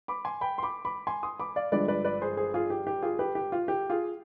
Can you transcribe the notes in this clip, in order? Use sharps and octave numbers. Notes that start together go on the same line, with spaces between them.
B5 D6
G#5 C6
G5 B5
C6
B5 D6
B5 D6
G#5 C6
C6 D#6
B5 D6
D5 F5
G1 G2 F3 G#3 D4 B4 D5
B4 D5
B4 D5
G#4 C5
G#4 C5
F4 G#4
G4
G4
F4 G#4
G4 B4
G4
F4
G4
F4 G#4